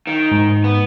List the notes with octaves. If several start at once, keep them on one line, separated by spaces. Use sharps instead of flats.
D#3
G#2
B3